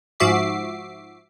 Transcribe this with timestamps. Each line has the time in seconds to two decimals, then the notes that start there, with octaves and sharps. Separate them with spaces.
0.20 G#2 F3 F#4 E5 D6 C7